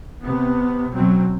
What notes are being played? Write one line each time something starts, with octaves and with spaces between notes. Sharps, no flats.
C3 B3
B2 F#3 C4